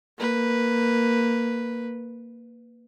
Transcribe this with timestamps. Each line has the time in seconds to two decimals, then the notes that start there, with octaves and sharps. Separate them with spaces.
0.18 A#3 B4